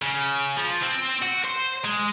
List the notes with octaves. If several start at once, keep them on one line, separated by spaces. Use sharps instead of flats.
C#3
F3
C4
F#4
C5
G#3